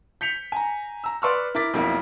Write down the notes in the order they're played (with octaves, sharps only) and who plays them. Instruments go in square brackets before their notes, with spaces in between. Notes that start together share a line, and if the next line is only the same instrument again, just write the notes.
[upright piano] G6 B6 C#7 F7
G#5 A#5
A#5 E6
B4 D5 C6 C#6 E6 F6
E4 A#4 D6 A6 B6
B1 F2 A#3 E4